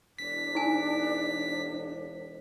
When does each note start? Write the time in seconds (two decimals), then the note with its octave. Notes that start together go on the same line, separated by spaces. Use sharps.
0.18 E1 D4 B6
0.55 D#4 G#5